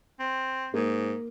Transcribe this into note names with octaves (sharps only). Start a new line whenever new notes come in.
C4
G#2 A#3